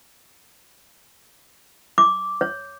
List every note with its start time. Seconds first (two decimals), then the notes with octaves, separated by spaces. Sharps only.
1.98 D6
2.41 C#5